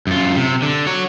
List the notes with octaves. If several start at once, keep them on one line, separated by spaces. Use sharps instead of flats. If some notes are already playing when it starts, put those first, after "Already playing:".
F#2 F4
C3
D3
F#4 C#5